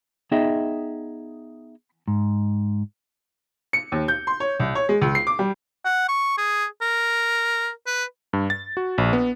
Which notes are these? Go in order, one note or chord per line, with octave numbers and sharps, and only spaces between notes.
B3 D#4 G#4 D#5 E5 G5
G#2
C#7
D#2
G6
C6
C#5
C2
C#5
G#3
C#2
C7
D6
G3
F#5
C#6
G#4
A#4
B4
G2
A6
F#4
A#1
B3